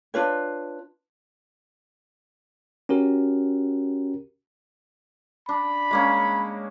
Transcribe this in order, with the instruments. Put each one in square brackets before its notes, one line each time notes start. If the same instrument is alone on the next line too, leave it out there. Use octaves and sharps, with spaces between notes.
[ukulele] D4 F4 B4 C#5
[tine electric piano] C#4 F#4 G4 A#4
[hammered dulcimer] D4 [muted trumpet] B5
[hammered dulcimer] G#3 A#3 C#4